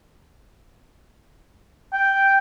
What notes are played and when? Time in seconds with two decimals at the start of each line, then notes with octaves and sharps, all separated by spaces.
1.93 G5